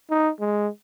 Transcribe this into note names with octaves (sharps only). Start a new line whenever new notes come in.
D#4
G#3